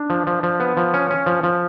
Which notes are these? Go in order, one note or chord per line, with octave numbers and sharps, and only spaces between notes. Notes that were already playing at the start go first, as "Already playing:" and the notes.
Already playing: D4
F3
F3
F3
B3
F3
C#4
C#4
F3
F3